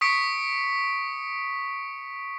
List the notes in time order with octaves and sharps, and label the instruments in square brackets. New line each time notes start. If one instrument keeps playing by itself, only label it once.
[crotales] C#6 D#6 B6 C#7 D7